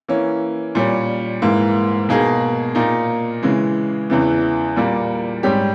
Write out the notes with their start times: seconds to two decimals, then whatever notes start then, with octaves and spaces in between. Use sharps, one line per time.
0.08 E3 A#3 C#4
0.75 A#2 G3 C#4
1.42 G#2 E3 A#3
2.09 B2 A#3 D#4 G#4
2.75 A#2 A#3 D#4
3.43 C#3 E3 G#3
4.10 E2 C#3 E3
4.76 A#2 G3 A#3
5.43 G#2 G3 C#4 G4